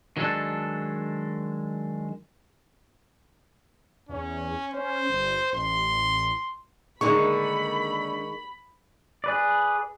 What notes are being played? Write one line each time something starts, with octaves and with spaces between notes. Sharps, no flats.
D#3 F#3 G#3 D4 A4
E2 C#4
C#4 C5
G1
A1 C6
D3 D#3 G#3 A#3 D#4 B5 C#6
G#4 B4 D5